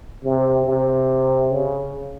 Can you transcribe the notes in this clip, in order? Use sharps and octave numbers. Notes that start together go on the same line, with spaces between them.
C3
C3
C#3